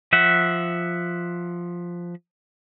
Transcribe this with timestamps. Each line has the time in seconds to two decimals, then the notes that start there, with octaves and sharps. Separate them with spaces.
0.13 F3 E5 F#5